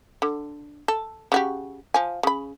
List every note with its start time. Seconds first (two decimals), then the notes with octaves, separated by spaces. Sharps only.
0.22 D3
0.88 A4
1.32 C#3 F#4 G4
1.94 F3 G#5
2.23 C#3 B5